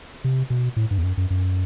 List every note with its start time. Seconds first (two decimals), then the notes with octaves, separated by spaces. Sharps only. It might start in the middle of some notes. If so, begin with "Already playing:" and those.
0.24 C3
0.50 B2
0.76 A2
0.91 G2
0.98 E2
1.04 F#2
1.17 F#2
1.30 F#2